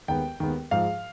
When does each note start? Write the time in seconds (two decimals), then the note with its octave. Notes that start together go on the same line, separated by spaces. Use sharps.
0.08 D#2 D#3 G#3 B3 G5
0.40 D#2 D#3 G#3 B3
0.71 G#2 F3 G#3 F5